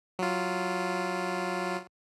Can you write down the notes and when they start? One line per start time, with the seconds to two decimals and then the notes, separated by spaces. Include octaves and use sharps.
0.19 F#3 F4